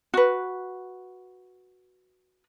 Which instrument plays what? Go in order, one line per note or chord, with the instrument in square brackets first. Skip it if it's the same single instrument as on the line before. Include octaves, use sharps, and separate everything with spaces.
[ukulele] F#4 B4